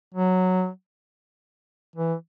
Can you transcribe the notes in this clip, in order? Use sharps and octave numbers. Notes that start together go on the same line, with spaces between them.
F#3
E3